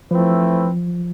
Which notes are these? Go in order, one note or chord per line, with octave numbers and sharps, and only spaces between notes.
F3 A3 C4 E4 B4